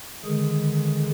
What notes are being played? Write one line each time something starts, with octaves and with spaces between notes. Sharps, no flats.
D3 D#3 G#3 G#4